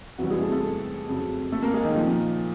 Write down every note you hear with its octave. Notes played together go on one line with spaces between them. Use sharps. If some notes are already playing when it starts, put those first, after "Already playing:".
E2 C3 E3 F#3 G3 F#4
G#3 G#4
A3 A4
A3 A4
F2 C#3 F#3
A3 A4
A#3 A#4
G#3 G#4
D#3 D#4
A#2 F3